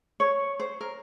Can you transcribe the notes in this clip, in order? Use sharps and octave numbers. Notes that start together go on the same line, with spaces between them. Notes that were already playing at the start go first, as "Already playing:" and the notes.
C#5
C5
A#4